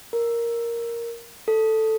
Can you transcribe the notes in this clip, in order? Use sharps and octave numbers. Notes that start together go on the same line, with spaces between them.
A#4
A4